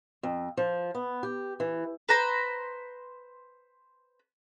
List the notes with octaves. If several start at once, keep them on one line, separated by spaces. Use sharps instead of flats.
F2
F3
B3
G4
E3
B4 C5 A#5 B5